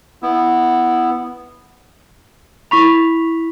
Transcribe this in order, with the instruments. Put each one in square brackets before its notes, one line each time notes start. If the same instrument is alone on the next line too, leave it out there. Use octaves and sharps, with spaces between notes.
[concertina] B3 E4
[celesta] E4 B6 F7 [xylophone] B5 C#6